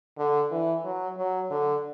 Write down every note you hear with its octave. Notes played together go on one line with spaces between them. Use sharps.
D3
E3
F#3
F#3
D3